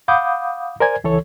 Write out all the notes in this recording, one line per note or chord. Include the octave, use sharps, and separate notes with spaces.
F5 F#5 B5 D6 D#6 G6
A#4 C5 D5 G#5 G#6
C#2 E3 A4 C#5